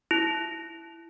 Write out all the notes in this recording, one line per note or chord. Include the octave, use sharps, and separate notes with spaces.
E4